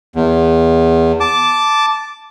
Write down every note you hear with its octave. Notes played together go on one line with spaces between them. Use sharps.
E2
A5 D6